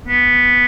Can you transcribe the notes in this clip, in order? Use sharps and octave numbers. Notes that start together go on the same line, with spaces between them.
B3